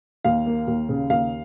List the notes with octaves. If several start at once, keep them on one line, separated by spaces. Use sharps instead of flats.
D#2 F5
A#3
D#2
C#3
D#2 F5